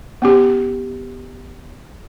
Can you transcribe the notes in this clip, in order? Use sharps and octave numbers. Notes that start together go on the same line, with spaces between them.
B3 C#4 G4